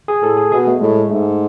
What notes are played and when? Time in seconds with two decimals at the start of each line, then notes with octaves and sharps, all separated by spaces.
0.08 G#4
0.22 A2 A4
0.37 G#4
0.52 B2 G#4
0.67 A3
0.81 A2 G#3
1.10 G#2 A3